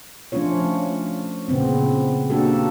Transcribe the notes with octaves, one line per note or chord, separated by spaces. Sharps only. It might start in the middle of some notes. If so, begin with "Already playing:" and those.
F3 A3 C#4 D4 F4 C#5
A#2 C#3 B3 C4
A#3 D4 F#4 G4 A4